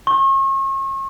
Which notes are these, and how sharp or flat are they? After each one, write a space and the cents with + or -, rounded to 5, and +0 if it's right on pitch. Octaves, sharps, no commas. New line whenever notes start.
C#6 -40